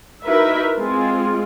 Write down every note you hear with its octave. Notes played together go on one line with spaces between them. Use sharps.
D#4 E4 F#4 A#4 B4 E5
G#3 C4 F4 G#4